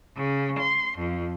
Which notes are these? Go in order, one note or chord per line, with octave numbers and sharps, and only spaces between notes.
C#3
C6
F2